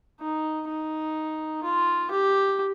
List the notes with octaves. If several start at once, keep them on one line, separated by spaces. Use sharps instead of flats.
D#4
D#4
F4
G4